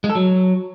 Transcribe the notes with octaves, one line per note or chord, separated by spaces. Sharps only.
G#3
A4
F#3